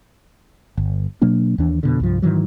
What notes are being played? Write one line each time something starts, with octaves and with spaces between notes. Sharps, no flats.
G1
B2 F#3 A#3 D4
D#2 E3 D4
F2 B2 D3
C2 G2 F3
G#2 D#3 E3 F#3